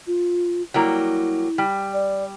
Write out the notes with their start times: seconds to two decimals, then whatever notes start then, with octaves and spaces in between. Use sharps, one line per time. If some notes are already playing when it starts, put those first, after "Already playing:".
0.07 F4
0.74 F#3 G3 A#3 E4
1.58 G3
1.94 D5